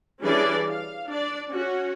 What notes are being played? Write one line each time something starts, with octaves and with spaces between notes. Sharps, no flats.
E3 G3 C#4 D4 G#4 D5
F5
D4 D5
C#4 F#4